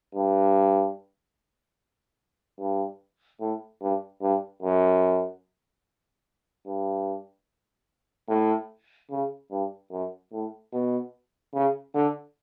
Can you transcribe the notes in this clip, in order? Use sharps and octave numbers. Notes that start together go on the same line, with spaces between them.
G2
G2
A2
G2
G2
F#2
G2
A2
C#3
G2
F#2
A2
B2
C#3
D3